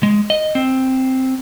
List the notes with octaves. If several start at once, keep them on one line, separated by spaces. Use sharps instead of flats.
G#3
D#5
C4